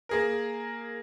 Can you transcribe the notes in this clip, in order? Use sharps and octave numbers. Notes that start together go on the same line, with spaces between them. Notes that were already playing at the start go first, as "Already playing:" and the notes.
A#3 G#4 A#4